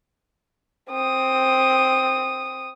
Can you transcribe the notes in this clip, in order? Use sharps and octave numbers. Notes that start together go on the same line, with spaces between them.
C4 D#6